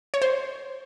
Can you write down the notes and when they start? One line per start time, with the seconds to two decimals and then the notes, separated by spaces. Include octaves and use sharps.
0.14 C#5
0.22 C5